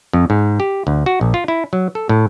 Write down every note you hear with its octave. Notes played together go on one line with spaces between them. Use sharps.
F2
G#2
G4
D2
F#4
A#1
F4
E4
F#3
A4
A2